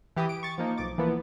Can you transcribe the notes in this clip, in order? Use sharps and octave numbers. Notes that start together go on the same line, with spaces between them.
E3 G4 B5 D#6
D7
C#6 A6
F3 A#3 D#4
B1 F3 D6 A6
E3 F3 A#3 B3